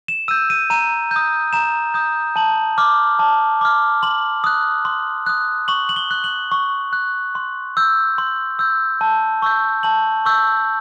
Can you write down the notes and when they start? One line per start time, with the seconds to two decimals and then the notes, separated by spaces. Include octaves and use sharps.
0.08 E7
0.28 E6 D#7
0.31 G6
0.50 D#7
0.70 A#5 D#7
1.11 D#6 G6
1.53 A#5 E7
1.94 D#6 G6
2.36 A5 F#7
2.78 D6 F6
3.19 A5
3.61 D6 F6
4.03 C6 F#7
4.44 D#6 F#6
4.85 C6
5.26 D#6 F#6
5.68 C#6 F#7
5.89 F#7
5.96 G7
6.11 F#6
6.24 F#7
6.52 C#6
6.93 F#6
7.35 C6
7.77 E6 G6
8.18 C6
8.59 E6 G6
9.01 A5
9.42 C#6 E6 G6
9.83 A5 F#7
10.25 C#6 E6 G6